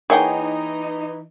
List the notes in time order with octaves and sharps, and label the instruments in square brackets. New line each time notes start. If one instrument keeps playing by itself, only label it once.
[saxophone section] E3 D#4 [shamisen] A#3 E5 F#5 [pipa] G#4 C#5 G5